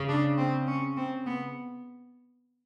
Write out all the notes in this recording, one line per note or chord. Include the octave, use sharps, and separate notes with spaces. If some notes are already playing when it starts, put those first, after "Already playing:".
Already playing: C#3
D4
C4
C#4
C4
B3